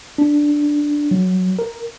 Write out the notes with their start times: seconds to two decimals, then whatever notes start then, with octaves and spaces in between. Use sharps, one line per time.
0.18 D4
1.11 F#3
1.59 A#4